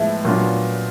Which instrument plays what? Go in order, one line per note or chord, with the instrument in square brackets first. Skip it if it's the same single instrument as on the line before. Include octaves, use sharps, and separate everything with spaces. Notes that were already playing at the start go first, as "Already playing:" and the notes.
Already playing: [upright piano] A2 F3 G#3 B3 E4 [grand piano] E5
[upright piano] A#2 F#3 B3 D4 F4